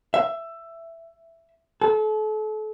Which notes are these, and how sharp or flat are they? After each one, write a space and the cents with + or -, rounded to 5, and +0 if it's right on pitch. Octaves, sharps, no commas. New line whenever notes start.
E5 +15
A4 -35